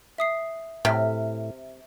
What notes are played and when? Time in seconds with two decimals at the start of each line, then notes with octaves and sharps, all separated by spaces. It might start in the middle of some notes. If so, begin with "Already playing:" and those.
0.18 E5 D#6 C7
0.85 A2 C3 E5 F6